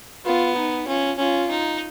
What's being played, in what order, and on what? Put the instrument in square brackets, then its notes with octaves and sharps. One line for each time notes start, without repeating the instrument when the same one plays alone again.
[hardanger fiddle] B3 [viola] F4
[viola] D#4
[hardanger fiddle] C#4 [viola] F4
[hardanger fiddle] C#4 [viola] F4
[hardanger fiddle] D#4